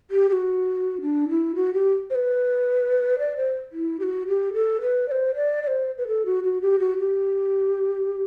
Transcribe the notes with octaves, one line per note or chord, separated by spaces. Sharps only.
G4
G4
F#4
D4
E4
F#4
G4
C5
B4
D5
C5
E4
G4
F#4
G4
A4
B4
D5
C5
D5
D5
C5
B4
A4
F#4
F#4
G4
F#4
G4